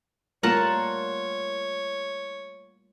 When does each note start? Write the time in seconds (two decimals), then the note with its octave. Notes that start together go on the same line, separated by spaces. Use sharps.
0.43 G3 A3 A#3 F4 A#4 C#5 F#5 A5